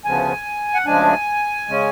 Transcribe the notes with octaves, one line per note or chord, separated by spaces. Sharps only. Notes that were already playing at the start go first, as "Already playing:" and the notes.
D2 C#3 F3 B3 G#5
F#5
D2 C#3 F3 G#3 D4 G#5
C#3 G#3 C#4